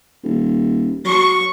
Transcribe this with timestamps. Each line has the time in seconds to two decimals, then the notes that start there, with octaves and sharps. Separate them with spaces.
0.23 D#1
1.05 F#3 C#6